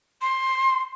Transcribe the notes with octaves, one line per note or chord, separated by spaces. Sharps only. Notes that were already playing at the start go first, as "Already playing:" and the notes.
C6